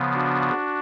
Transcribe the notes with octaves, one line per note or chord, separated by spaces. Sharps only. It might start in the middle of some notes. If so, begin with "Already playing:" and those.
Already playing: C#3 F3 B3
D4 F#4